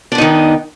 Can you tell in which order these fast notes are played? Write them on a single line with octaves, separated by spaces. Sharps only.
D4 B3 D#4 D#3